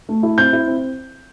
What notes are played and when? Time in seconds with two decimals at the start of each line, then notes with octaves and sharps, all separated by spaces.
0.09 A3
0.23 E4
0.38 C4 G6
0.53 E4
0.67 C4